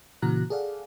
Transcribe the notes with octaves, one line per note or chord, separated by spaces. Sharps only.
A#2 C#3 E3 F#4 A#5 F#6
G#4 A4 D5 F5 F#5